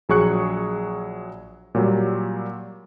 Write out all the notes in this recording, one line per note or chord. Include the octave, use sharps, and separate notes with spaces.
A#1 F#3 G#4 C#6 F#6 C#7
A#2 F#3 G3